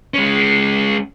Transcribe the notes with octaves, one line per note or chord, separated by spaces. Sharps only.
G#3 C#4